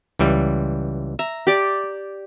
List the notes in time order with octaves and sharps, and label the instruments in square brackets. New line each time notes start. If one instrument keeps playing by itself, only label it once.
[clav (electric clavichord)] C#2 E3 G3
[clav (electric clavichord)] E5 [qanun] A#5
[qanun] G4 D5